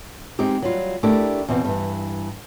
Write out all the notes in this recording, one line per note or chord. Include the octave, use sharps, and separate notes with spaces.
G#3 C4 D#4 G4
F#3 G3 F4
A3 D4 E4 G4 A#4
E2 B2 B3 C4
G2 E3